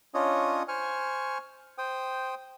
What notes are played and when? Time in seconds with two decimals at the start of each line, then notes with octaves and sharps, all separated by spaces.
0.14 C#4 D4 F4 C#5 D#5 D#6
0.68 C5 G#5 C#6 F6
1.78 C5 G5 D#6